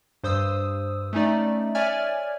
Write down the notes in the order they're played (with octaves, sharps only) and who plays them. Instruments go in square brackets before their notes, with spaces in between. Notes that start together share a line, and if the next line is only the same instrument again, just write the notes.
[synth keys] G2 C5 D#6 E6
A3 C#4 D#4 D5
C#5 D5 E5 G#5 F6 G#6